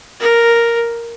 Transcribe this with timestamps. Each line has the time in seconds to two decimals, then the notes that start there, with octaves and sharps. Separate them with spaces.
0.20 A#4